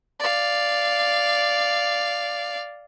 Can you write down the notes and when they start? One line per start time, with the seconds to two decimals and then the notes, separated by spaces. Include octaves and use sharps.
0.20 D5 F5